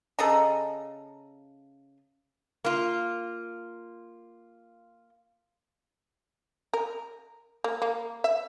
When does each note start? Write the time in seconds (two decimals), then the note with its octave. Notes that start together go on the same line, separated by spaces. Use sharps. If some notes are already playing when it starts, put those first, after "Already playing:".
0.19 C#3 A4 D#5 A#5
2.64 A#3 F4
6.73 A#4
7.64 A#3
7.82 A#3
8.24 E5